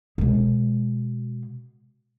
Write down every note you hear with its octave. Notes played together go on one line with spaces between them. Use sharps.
B2 G#3